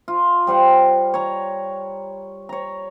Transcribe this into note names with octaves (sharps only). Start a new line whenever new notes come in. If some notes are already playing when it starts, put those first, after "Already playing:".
F4
G3 C5 F5 F#5
C#5 A#5
C#5 A#5